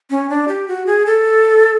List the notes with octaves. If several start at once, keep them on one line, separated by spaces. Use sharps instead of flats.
C#4
D4
G4
F#4
G#4
A4